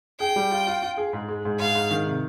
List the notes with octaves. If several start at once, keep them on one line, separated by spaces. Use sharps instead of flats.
G#4 G5
G3
F4
F4
F4
G#4
G#2
G#3
G#2
G#2 F5
G#2
D#3
C3